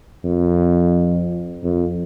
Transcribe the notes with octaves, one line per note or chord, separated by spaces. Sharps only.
F2
F2